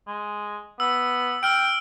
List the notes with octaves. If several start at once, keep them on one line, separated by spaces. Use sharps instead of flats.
G#3
B3 E6
G5 E6 F6 D7